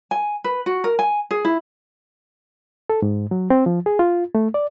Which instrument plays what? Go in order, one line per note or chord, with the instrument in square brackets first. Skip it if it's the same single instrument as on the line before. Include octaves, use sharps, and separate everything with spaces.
[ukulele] G#5
B4
F#4
A#4
G#5
G#4
E4
[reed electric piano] A4
G#2
F#3
C4
F3
G#4
F4
A3
D5